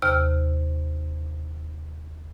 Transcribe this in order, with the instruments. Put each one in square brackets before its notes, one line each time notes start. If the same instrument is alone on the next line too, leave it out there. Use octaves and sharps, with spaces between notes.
[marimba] D#2 C3 F6